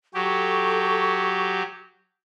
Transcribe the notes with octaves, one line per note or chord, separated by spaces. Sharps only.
F#3 G4 A4 C#6